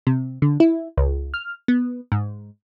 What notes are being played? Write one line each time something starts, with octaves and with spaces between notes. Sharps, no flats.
C3
D3
E4
C#2
F6
B3
G#2